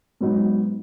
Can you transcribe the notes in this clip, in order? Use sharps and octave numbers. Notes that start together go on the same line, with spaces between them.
G#2 F#3 B3 D#4